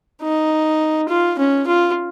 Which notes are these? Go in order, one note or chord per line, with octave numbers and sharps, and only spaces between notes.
D#4
F4
C#4
F4